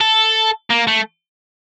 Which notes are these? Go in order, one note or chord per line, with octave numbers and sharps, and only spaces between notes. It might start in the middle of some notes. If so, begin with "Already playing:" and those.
A4
A#3
A3